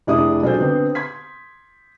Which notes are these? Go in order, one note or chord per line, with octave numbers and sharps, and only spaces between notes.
F1 D4 E4 G#4 D5 D#6
B1 D4 F4 A4 C5 G6
D3 B3 C4
C6 G#6 B6